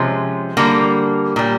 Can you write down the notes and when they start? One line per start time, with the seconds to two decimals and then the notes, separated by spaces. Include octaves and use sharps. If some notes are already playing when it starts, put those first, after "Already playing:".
Already playing: C3 F3 G#3 C#4
0.57 D3 G3 A#3
1.36 A#2 G3